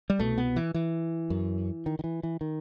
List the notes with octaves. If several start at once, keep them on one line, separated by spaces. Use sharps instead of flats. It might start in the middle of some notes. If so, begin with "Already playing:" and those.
G3
C2 B2 A3
B3
E3
E3
F#2
D#3
D#3
E3
E3
D#3